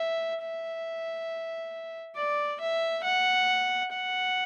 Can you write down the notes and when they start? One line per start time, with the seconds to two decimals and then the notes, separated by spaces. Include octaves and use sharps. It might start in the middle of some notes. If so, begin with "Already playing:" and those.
Already playing: E5
0.42 E5
2.16 D5
2.60 E5
3.04 F#5
3.92 F#5